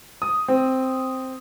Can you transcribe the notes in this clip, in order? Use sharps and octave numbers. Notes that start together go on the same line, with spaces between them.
D#6
C4